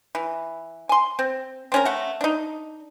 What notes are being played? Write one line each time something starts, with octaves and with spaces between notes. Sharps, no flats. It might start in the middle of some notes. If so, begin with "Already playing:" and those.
E3
G#5 C6
C4
C4 C#4 A#4
A3 F#5
D4 D#4